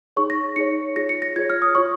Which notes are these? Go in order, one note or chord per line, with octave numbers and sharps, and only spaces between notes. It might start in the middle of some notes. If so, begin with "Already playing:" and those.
D#4 G#4 C#5 C#6
A#6
D#4 G#4 C#5 C#7
F4 G#4 C#5 A#6
C#7
A#6
F4 G#4 C#5 G#6
F6
D#6
F4 C#5 C#6